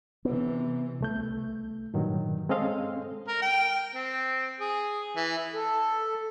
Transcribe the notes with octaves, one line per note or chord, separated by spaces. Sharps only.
C3 E3 B3
C2 A3 G6
G2 A#2 D#3 F#3
G#3 C4 C#4 A4 D#5 F5
A#4
G5
C4
G#4
E3
A4